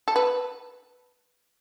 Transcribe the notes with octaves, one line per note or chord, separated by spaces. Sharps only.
A4
B4